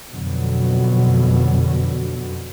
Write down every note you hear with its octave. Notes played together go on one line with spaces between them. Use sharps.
F2 B2 D3 F#3